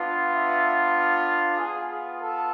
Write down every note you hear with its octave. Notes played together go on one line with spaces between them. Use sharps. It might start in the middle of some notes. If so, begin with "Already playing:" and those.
Already playing: B3 D4 F4
E5
F5
B3 F4 G#4
G#4
A4